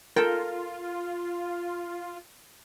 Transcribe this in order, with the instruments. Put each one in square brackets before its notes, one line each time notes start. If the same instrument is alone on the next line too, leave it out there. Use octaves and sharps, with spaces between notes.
[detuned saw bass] F4 [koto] A4 G5 [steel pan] A#4